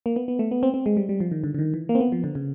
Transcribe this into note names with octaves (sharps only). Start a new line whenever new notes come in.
A#3
B3
B3
A3
B3
C4
C4
G#3
G3
G3
F3
D#3
D3
D3
D#3
E3
A#3
C4
B3
F3
D3
C#3